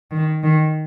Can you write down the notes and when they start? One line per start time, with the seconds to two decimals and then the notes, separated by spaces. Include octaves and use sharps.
0.11 D#3
0.43 D#3